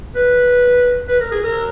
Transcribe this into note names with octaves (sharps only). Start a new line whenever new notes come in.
B4
B4
A#4
G#4
A#4